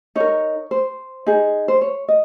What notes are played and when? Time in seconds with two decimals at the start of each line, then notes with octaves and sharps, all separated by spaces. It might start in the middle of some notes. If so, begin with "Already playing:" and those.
0.16 D#4 A#4 C#5
0.71 C5
1.26 D#4 G#4
1.68 C5
1.81 C#5
2.08 D#5